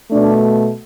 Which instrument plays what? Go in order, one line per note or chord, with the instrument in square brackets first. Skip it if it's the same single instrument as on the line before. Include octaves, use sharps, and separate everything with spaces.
[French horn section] B2 A3 D4